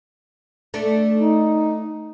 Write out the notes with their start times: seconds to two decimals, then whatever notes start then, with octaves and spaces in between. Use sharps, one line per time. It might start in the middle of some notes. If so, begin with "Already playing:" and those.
0.74 A3 D4
1.15 D#4